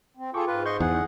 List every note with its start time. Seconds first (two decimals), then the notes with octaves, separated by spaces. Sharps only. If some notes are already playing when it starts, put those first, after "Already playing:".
0.17 C4
0.34 F4 G#4 A4 G5 C#6 D6
0.47 G#2 F4 B4
0.66 D#5 C6 C#6 G6
0.80 E2 D#4 G#4 F#5